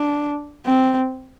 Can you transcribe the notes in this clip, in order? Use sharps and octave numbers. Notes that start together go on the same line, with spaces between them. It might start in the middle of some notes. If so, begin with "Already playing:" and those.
Already playing: D4
C4